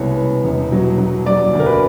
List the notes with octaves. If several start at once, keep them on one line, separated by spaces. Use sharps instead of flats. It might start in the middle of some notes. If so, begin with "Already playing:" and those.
Already playing: C2 B2 G#3 B3 C#5
B3
E1
F#3
F#3
F#3 D5
D2
A#4
B4